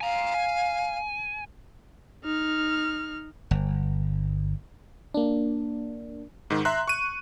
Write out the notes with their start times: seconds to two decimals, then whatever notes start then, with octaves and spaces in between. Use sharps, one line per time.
0.01 F5 G#5 A#5
0.34 G#5
2.24 D#4 F6
3.51 G1
5.14 A#3 D4
6.50 G#2 D#3
6.65 E5 A#5 C6 F#6
6.88 C#6 D#7